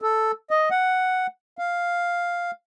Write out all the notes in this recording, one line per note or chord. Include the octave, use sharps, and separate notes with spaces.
A4
D#5
F#5
F5